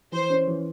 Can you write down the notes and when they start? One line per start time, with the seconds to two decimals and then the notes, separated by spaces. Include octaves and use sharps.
0.12 E3 C5
0.30 C#4
0.48 E3